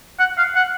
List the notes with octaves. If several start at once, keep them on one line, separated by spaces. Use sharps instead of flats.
F#5
F5
F#5